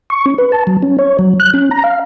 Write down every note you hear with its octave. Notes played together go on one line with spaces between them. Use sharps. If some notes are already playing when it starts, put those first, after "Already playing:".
C#6
C#4
B4
A5
F#3
C#4
C#5
F#3
F#6
C#4
A#5
F5